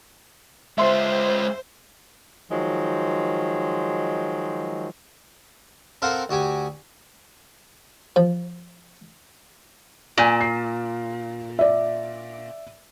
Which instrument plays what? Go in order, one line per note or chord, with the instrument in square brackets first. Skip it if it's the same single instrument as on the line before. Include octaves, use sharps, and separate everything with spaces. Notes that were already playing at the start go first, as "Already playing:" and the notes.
[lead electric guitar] G#3 F4 [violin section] C5 [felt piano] E5 C6
[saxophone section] D#3 F3 F#3 G#3
[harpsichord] C4 A4 A#4 C5 F5 F#5
D2 F#4 G4 G#5
F3
[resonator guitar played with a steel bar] A#2 [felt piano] D5 G#5 D#7
[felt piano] C7
D5 E5